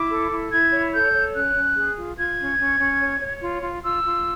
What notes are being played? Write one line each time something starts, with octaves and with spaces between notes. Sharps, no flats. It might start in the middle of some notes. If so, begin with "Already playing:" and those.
Already playing: E4 D6
A4
E4
E4 G#6
C#5
A4 G6
C#5
C#4 F#6
C#4
G#4
F4
F4 G#6
C#4
C#4
C#4
C#5
C#5
F4
F4
F4 E6
F4